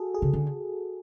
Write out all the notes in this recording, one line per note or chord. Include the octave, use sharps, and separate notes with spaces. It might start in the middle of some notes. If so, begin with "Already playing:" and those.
Already playing: F#4 G#4 A4
G#4
C#3
D3